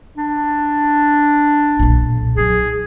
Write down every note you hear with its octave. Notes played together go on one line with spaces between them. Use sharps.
D4
B1 A#2
F#3 D#4 G#4